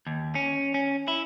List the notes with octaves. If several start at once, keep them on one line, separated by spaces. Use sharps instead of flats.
D#2
C#4
C#4
E4